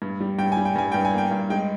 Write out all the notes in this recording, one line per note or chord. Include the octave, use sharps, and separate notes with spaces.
G2
G3
G2 G5
G3 G#5
G5
G2 G#5
G2 G5
G#5
A#3 G5
G2
G#3 G5